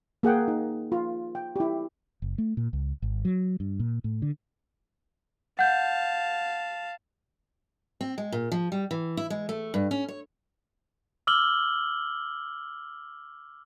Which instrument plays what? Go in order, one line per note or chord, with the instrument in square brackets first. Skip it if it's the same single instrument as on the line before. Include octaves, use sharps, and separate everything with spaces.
[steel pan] A#3 G#4 F#5 G5
D#4
F4
G5
E4 G4
[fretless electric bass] F#1
A3
A#2
C#2
G#1
F#3
G2
A#2
A2
D3
[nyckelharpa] F5 A5 [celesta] F#5 G6
[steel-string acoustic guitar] C4
G#3
A#2
F3
G3
E3
E4
G#3
A3
G2
C#4
C#5
[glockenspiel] D6 E6 F6 F#7 G7